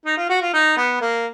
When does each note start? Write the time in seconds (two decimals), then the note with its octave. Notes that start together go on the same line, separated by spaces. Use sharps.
0.06 D#4
0.17 F4
0.29 F#4
0.42 F4
0.53 D#4
0.77 B3
1.01 A#3